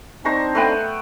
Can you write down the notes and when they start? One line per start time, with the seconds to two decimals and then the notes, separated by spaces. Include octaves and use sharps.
0.25 C4 D4 D#4 C5 A#5 C#6
0.55 A3 B3 G5